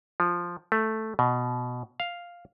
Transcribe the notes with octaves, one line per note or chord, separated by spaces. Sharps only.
F3
A3
B2
F5